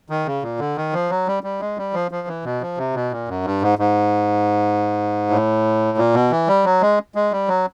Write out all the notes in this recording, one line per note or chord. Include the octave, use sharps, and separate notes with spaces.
D#3
C#3
A#2
D3
D#3
F3
F#3
G3
G3
G#3
G3
F3
F3
E3
B2
F3
C3
B2
A#2
F#2
G2
G#2
G#2
A2
A#2
B2
E3
G3
F#3
G#3
G#3
G3
F#3